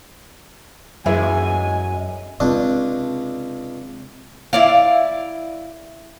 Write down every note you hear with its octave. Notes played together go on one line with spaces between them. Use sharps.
F#2 E3 G#3 E4 G#5
C#2 C3 D4
E4 D5 F5